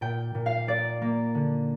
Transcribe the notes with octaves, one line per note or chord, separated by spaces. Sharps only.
A#2 G5
A#2
F5
A#3 D5
A#3
D3